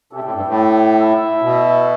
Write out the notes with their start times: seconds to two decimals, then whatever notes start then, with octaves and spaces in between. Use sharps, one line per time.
0.13 C3 D4 A4 E5 G5
0.23 A2
0.34 G2
0.45 A2
0.98 E4 A4 E5
1.42 B2